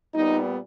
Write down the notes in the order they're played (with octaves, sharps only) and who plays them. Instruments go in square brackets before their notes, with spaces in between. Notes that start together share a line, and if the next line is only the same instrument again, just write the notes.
[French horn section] A#2 G3 B3 D#4